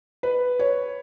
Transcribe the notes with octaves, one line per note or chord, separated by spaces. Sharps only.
B4
C#5